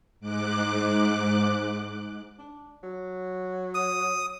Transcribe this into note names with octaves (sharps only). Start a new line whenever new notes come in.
G#2 D6 F#6
D4
F#3
D#6